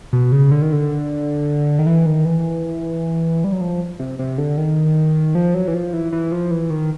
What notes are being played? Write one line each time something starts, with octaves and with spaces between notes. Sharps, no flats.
B2
C#3
D3
D#3
D3
D#3
E3
D#3
E3
G3
F#3
F3
C3
C3
D3
D#3
F3
F#3
E3
F3
E3
E3
F3
E3
D#3